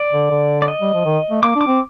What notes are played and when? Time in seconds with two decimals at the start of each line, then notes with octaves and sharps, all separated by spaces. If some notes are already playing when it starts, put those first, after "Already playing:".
Already playing: D5
0.13 D3
0.31 D3
0.62 D5
0.68 D#5
0.81 G3
0.93 F3
1.05 D#3
1.30 A3
1.42 A#3 D6
1.56 D4
1.61 D6
1.67 C4